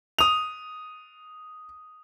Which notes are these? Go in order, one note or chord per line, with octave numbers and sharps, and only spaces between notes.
D#6 F7